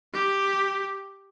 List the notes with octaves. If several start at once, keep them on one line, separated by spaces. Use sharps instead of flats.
G4